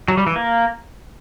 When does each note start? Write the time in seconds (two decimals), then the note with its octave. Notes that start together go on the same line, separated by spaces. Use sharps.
0.08 F#3
0.17 G3
0.27 E3
0.36 A#3